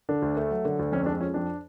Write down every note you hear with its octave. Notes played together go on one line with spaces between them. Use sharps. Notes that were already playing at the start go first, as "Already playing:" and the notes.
D3 D4
D2
A3
F#3
D3
D2
F2 C#4
G#3 D4
F3 C#4
F2 D4